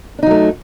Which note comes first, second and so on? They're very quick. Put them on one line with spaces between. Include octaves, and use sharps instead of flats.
D4 D#4 F#3 A3